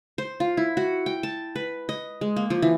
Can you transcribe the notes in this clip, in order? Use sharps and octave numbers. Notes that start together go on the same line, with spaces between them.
C5
F4
E4
F#4
G5
A5
B4
D#5
G#3
A#3
F3
E3